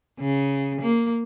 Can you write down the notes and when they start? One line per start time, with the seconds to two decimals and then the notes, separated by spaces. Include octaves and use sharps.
0.20 C#3
0.81 A#3